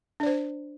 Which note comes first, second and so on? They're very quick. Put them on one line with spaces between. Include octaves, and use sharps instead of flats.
D4 D5 C5